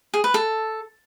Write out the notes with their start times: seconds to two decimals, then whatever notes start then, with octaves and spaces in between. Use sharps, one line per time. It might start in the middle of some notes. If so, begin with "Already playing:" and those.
0.14 G#4
0.24 B4
0.34 A4